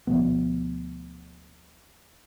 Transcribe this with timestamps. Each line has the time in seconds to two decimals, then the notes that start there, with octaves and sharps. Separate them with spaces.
0.07 D2 B2 F3 B3